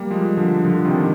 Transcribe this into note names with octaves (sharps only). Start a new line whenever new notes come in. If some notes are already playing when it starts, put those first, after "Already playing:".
Already playing: G3 A#3
F3 G#3
D3 F3
D3 F3
C3 D#3